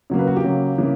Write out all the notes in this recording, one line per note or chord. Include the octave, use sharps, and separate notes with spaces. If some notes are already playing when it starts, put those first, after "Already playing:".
C#3 F#3 A#3
B4
F#4
G4
C#3 F#3 A#3
C#3 E3 G3 A#3